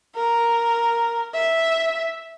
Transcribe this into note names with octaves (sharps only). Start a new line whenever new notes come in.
A#4
E5